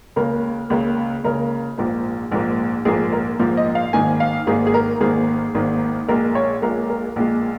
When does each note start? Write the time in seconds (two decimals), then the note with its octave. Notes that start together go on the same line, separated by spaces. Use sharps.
0.16 C#2 C#3 A#3 A#4
0.70 C#2 C#3 A#3
1.24 C#2 C#3 A#3 A#4
1.78 A#1 G#2 F3 A#3
2.32 A#1 G#2 F3 A#3
2.85 A#1 G#2 F3 A#3 G#4
3.13 A#4
3.39 A#1 G#2 F3 A#3 A#4
3.57 D#5
3.75 F5
3.93 G#1 G#2 D#3 A#3 G#5
4.20 F5
4.47 G#1 G#2 D#3 A#3 G#4
4.67 G#4
4.74 A#4
5.01 G#1 G#2 D#3 A#3 G#4
5.55 G#1 G#2 D#3 A#3
6.08 A#1 A#2 G#3 A#4
6.35 C#5
6.62 A#1 A#2 G#3 A#4
6.90 A#4
7.16 A#1 A#2 G#3